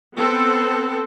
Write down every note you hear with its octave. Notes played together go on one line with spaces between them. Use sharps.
B3 C4 A4